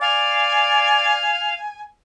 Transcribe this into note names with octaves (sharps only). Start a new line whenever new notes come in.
D5 F5 G#5